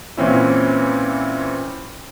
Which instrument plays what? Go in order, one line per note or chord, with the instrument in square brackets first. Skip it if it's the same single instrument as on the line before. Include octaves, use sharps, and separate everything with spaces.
[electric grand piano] A#2 E3 C4 C#4 E4